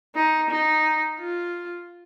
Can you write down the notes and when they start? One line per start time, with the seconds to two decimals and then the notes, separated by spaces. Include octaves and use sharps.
0.15 D#4
0.50 D#4
1.20 F4